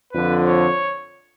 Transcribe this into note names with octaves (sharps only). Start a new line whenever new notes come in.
F2 D3 F3 B4
C#5